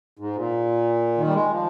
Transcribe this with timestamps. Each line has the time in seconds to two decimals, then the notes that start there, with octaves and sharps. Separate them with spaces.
0.19 G#2
0.36 A#2
1.18 D#3
1.27 G3
1.34 G#3
1.51 F3